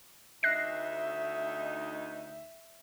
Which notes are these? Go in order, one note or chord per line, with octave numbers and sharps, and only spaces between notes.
D2 D#4 E5 F#6 A#6 C7